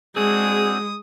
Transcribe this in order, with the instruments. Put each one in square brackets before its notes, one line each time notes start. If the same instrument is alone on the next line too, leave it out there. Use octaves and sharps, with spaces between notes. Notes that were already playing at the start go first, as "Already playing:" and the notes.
[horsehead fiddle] G#3 [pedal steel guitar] C4 D4 F#4 [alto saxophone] G#4 [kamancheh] D#6